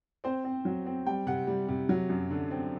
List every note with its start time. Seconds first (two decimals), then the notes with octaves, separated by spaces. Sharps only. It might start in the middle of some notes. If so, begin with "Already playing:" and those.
0.24 C4 C5
0.44 C4
0.65 F#3
0.86 C4
1.06 G3 G5
1.27 C3 F#5
1.47 G3
1.68 C3
1.89 F#3
2.09 F#2
2.31 D3
2.51 C4